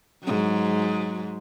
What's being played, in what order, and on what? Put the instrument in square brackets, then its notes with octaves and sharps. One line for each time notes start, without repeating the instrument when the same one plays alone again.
[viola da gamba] G#2 F#3